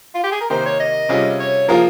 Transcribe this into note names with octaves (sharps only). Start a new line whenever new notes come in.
F4
G4
G#4
A#4
C3 D#3 A#3 D#4 G4 C5
C#5
D#5
C3 G3 C#4 F4 G#4
C#5
F3 A#3 F4 G#4 A#4